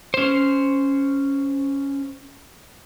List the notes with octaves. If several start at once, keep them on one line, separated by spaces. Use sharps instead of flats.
C#4 C5